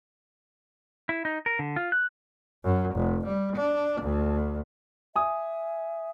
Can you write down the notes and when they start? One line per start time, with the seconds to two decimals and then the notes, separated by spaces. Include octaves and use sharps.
1.09 E4
1.25 D#4
1.46 A#4
1.59 D3
1.76 F4
1.92 F#6
2.64 F#2
2.96 F1
3.27 G3
3.56 D4
4.02 D2
5.16 E5 G#5 D#6